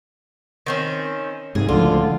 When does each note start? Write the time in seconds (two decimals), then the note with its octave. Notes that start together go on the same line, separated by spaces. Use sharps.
0.66 D#3 C4 C#4
1.55 G#2 C3 G#4
1.69 C#2 A2 D3 F3 F4